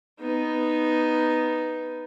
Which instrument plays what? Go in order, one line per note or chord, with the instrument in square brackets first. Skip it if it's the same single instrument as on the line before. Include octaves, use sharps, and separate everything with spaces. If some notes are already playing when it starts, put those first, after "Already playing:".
[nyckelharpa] B3 D#4